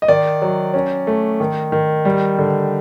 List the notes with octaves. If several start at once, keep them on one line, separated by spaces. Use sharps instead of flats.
D#5
D#3 D5
F#3
C#4
A3
D#3
D#3
G3
D3